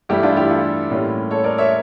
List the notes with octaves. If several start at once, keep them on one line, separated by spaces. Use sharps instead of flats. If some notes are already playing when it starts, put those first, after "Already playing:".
G2 E3 A3 E4 G4
D4 F4
E4 G4
F4 A4
A2 G3 A#3 C#4
A4 C#5
A#4 D5
C#5 E5